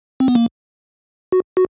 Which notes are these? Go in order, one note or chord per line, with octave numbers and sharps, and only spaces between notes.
C4
B3
A#3
F#4
F#4